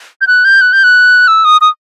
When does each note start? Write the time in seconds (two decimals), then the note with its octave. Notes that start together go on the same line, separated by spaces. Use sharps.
0.21 G6
0.27 F#6
0.45 G6
0.61 F#6
0.73 G6
0.84 F#6
1.28 E6
1.45 D#6
1.61 D#6